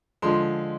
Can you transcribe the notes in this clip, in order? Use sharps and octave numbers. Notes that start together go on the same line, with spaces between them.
D3 F3 G#3 C6